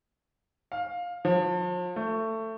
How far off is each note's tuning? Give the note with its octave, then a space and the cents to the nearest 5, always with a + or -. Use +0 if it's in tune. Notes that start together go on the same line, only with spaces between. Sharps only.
F5 +15
F3 +40
A3 +20